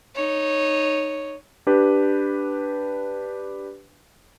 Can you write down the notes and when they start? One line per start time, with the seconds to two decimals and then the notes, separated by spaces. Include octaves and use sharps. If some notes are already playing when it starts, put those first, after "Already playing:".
0.14 D#4 C#5
1.67 D4 G4 B4